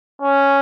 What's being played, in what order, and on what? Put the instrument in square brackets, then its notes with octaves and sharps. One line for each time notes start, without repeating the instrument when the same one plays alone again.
[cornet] C#4